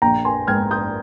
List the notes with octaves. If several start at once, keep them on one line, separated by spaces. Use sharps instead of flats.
A#1 G5 A#5
G#5 C6
G#2 F6 G#6
D#6 G6